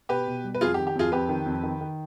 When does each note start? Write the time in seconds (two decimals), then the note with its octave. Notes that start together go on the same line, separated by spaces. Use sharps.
0.09 B2 G4 B4
0.27 B2
0.44 G3
0.54 B4
0.61 F2 F4 G#4
0.74 D#3 G4
0.87 G4
0.95 F2 F4 G#4
1.12 F2 G4 B4
1.29 D#3
1.46 F2
1.63 D#3
1.81 D#3